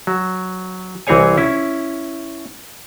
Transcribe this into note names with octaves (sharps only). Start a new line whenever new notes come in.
F#3
C2 E3 C4 G#4 C#5 G#5
C#4 E4